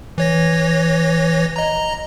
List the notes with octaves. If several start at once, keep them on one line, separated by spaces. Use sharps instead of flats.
E3 C#5 A#6
D#5 A#5